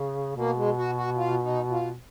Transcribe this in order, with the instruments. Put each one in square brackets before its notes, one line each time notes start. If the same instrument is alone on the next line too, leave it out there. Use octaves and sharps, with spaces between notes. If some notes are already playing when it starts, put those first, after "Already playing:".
Already playing: [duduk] C#3
[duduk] B2 [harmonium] A#3
[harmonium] G#3
F#4
F#4
F4
D#4
F4